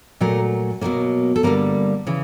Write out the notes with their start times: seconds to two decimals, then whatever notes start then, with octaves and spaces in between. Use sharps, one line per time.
0.20 A#2 F#3 A3 A#4
0.81 B2 F#3 A#3 A#4
1.36 A4
1.43 G2 D3 G3 A#3 A#4
2.07 C#3 E3